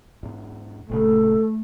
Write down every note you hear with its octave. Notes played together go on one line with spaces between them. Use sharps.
E2 G#2
G1 A#2 C#3 A3 A4